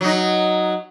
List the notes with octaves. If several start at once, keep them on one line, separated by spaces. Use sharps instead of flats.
F#3 D#4